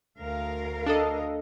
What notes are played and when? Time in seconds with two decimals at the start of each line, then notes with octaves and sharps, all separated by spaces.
0.19 D2 A#4 F5
0.86 D4 A4 D#5